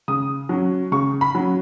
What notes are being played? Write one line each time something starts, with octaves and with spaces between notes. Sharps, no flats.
C#3 D#6
F#3 C#4
C#3 C#6
B5
F#3 C#4